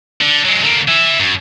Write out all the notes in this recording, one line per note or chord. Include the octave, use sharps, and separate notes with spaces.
D3
F#3 G#3
D3 A#3
E5 G#5
F#2